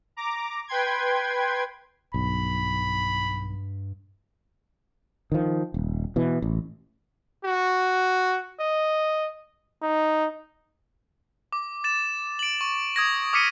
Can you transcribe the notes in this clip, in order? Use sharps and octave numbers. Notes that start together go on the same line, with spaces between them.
A#5 D6
B4 G5 C6 G#6
B1 G2 B5
D#3 F3
D#1
B2 E3
A1
F#4
D#5
D#4
D6
A6 E7
D7 F#7
C#6
D#6 G#6 A#6
D6 D#6 F6 B6 C#7 D#7